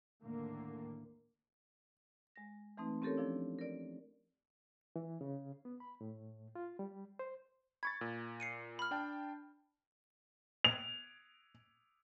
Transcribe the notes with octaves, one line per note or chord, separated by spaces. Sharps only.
D#2 A2 D3 A#3
G#3 A#6
E3 A3 C4 D#4 B4
C4 C#4 G4 A4 A#4 C#5
F3 D4 E4 D5
A#4 D5
E3
C#3
B3
B5
A2
F4
G3
C5
B5 C#6 G#6 A6
A#2
C7 C#7 D#7
B5 F6
D4 G5 A5
F7